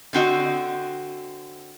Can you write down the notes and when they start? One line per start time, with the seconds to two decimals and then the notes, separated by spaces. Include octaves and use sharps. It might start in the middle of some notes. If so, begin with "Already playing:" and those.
0.13 D3 C4 F#4 D#5